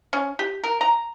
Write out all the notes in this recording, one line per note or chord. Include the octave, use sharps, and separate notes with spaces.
C#4
G4
A#4
A#5